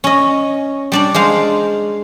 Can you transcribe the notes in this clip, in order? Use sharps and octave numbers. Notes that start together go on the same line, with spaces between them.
C#4 D#5
G3 D4 D5
G#3 C5 F5